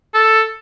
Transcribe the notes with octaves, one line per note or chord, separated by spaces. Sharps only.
A4